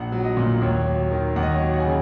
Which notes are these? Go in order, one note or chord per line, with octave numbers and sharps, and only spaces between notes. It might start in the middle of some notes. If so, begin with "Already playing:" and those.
Already playing: A#1 F#5
F#3
D#5
A#2
D#2 C#5
F#3
D#3
D#2 F#5
D#5
C#5
F#3 D#5
F#5
G#5
C#3